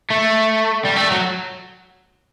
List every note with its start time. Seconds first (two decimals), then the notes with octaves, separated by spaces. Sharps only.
0.11 A3
0.85 G3
0.97 A3
1.11 F#3